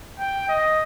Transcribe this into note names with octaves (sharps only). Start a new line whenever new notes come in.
G5
D#5